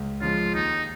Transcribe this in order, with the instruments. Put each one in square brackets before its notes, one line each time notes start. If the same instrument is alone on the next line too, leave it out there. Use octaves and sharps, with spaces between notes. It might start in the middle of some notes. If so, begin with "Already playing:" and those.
Already playing: [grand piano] C#2
[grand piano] C#3 F3 G#3 [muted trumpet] F4
[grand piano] D#2 [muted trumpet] D#4